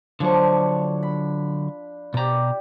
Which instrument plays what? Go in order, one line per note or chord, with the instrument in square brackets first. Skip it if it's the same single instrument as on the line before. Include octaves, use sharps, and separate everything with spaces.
[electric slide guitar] D3 F#3 C#5 [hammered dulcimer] F3 D4
[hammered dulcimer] B5
[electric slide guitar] B2 A#5 [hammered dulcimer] G4 D5